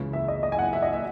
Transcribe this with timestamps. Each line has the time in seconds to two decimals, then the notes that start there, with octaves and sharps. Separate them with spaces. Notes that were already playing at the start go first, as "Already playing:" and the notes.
Already playing: C#2 C#3 E3
0.13 E5
0.28 D#5
0.43 D#5
0.52 G#5
0.59 F#5
0.73 E5
0.82 D#5
0.93 E5